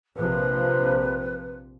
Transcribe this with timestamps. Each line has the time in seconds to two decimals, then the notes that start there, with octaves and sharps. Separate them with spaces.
0.16 A#1 C3 F3 B4